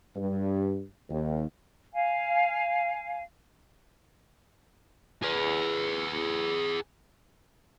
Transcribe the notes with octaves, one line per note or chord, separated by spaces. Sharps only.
G2
D#2
F5 G#5
G#4 B4